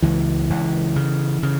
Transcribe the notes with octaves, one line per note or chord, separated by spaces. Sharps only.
C#2 E3
C#2
C#3
C#3